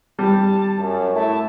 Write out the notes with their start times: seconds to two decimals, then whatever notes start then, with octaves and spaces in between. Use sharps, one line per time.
0.19 G3 A5
0.78 F#2
1.15 A3 E4 E5 A5